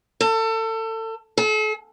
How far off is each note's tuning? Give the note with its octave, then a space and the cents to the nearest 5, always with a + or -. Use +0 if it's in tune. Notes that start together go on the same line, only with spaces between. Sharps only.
A4 +30
A4 -40